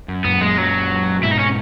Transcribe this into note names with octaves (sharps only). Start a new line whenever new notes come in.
F#2
F#2 A#2 B3
F#2 A#2 G#3
F#3
G#2 B2 E4
D#4
C#4